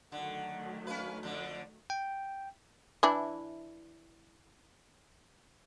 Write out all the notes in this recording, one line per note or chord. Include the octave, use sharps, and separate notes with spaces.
D3 D#3 F#3 A3 F#5
C#4 B4 F5
F2 D3 D5
G5
E3 D4 E4